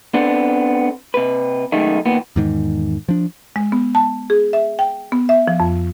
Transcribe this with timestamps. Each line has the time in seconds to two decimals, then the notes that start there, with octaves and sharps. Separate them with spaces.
0.14 B3 C4 D4 A4
1.14 C3 B4
1.72 F#2 D#3 G#3 A3 D#4
2.05 D#2 A#2 B3
2.36 E2 G#2 D#3
3.08 F3 D4
3.56 G#3
3.72 B3
3.95 A5
4.30 G#4
4.53 E5
4.79 G5
5.12 B3
5.29 E5
5.48 F3
5.60 F2